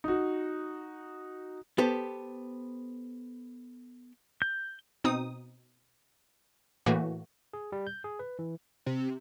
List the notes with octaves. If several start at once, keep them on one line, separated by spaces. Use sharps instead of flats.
D#4 F#4
B3 G4 A4 C5
G6
B2 C4 D#4 D#6
A2 E3 A3 A#3 F#4
G#4
G3
G6
G#4
B4
E3
C3